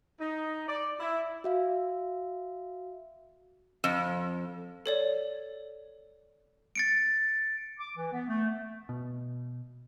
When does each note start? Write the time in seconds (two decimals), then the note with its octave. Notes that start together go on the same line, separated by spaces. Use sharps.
0.20 D#4
0.68 D5
1.00 E4
1.44 F#4 E5 F5
3.84 F2
4.86 A4 C#5 D5
6.75 A6 C#7 D7
7.79 D6
7.96 E3
8.12 B3
8.28 A3
8.49 A3
8.89 B2